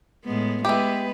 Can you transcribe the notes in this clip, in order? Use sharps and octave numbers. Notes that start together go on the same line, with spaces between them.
A2 G#3 B3
G#3 B3 E4 G4 B4